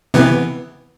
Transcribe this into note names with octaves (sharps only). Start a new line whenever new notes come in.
C3 E3 B3